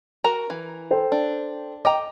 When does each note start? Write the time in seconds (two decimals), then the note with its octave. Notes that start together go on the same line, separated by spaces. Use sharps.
0.24 F#4 A#4 A#5
0.50 E3
0.91 A4 C5 G5
1.12 D4
1.85 D#5 G5 A#5 D6